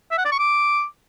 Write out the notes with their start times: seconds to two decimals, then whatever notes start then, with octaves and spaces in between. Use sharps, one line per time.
0.11 E5
0.18 F#5
0.25 D5
0.32 C#6
0.39 D6